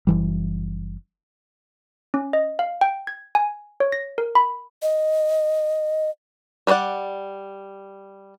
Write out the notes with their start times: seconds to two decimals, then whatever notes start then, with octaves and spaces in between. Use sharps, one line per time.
0.07 F#1 E3 G3
2.14 C#4
2.33 D#5
2.59 F5
2.81 G5
3.07 G#6
3.35 G#5
3.80 C#5
3.92 A#6
4.18 A#4
4.35 B5
4.82 D#5
6.67 G3 B4 C5 D5 F#5